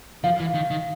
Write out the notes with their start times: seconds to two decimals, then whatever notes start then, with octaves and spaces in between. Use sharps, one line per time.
0.24 F3 F5
0.40 E3
0.55 D#3
0.71 D#3